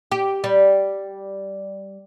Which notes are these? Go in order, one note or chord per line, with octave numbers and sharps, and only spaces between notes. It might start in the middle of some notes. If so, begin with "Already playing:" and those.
G4
G3